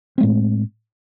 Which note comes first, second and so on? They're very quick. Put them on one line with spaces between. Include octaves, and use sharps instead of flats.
C4 G#3 A2